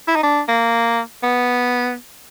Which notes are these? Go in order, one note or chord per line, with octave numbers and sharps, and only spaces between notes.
E4
D#4
D4
A#3
B3